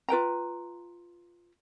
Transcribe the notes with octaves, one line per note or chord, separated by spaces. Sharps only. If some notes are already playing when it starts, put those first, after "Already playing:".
F4 B4 G5 A#5